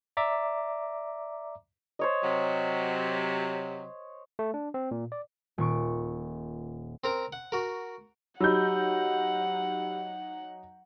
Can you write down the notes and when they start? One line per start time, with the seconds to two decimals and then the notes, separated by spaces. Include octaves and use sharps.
0.17 D5 E5 A#5 D6
1.99 C5 C#5 D#5
2.24 C3 F#3
4.39 A3
4.54 D4
4.74 C4
4.91 A#2
5.12 D5
5.58 D#1 A#2 C#6 D7
7.04 C4 A#4 A#5
7.33 F#5
7.52 F#4 A#4
8.40 F#3 D#4 G4 F#5 B5 E6 G6